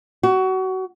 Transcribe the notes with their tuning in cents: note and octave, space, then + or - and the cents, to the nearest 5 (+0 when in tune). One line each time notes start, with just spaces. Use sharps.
F#4 +25